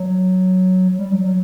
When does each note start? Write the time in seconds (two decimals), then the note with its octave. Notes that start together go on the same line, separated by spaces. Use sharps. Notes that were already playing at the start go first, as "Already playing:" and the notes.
Already playing: F#3
0.99 G3
1.12 F#3
1.24 F#3